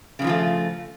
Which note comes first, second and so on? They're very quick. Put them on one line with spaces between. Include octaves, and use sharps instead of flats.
C#3 G3 F3 F4 A3